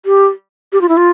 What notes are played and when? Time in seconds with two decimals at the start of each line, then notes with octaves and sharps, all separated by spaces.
0.06 G4
0.73 G4
0.81 F4
0.89 E4
0.97 F4